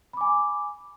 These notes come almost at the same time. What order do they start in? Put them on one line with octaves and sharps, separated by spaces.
B5 D6 G#5